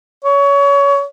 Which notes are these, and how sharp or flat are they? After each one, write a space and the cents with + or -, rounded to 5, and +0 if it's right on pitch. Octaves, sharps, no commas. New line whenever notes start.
C#5 +25